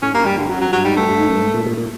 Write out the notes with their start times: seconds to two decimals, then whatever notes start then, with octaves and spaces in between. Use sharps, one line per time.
0.02 A2 C#4
0.14 G2 A#3
0.25 G2 G3
0.37 G2 D3
0.49 F#2 F#3
0.61 F#3
0.72 G2 F#3
0.84 G#2 G3
0.96 G2 A3
1.09 G2
1.20 G#2
1.28 F#2
1.35 G2
1.42 G#2
1.54 A#2
1.66 A#2
1.77 A#2